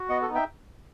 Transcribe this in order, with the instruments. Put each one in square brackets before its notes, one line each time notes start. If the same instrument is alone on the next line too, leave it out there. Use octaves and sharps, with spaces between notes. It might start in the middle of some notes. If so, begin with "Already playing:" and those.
Already playing: [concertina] F#4
B3 D#5 F#5
A4
D#4
E5 G5